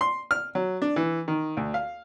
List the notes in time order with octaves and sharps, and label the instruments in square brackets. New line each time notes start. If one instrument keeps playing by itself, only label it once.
[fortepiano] C6
F6
F#3
D4
E3
D#3
D2
F5